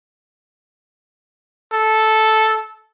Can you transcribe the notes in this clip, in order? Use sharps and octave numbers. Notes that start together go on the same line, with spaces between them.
A4